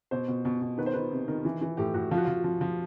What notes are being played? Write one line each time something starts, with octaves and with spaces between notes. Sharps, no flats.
B2 C5
B2
B2
B2
D#3 B4
C5
D#3 B4
C3
D#3 A#4
E3
E3
A2 G4
A2 F#4
F3 F4
F#4
F3 F4
F3
F3